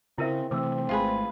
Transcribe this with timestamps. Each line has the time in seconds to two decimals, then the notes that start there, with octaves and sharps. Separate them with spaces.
0.18 C#3 C4 E4 A#4 E5
0.51 C3 E3 A3 C4 D6 E6
0.89 G#1 G#3 A3 F4 G#4 B4